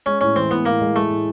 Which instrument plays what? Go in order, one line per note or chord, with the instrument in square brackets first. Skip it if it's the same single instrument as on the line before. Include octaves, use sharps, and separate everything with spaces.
[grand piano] G#3 [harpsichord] C#4
[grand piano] A2 [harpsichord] C#4
[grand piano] E3 [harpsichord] C4
[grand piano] A2 [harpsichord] B3
[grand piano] A2 [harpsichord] A#3
[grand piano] G#3
[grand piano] G#3 [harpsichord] A3
[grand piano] A2